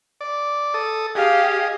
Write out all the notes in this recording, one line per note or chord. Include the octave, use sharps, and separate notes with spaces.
D5
A4 D#6
G4 G#4 D#5 F5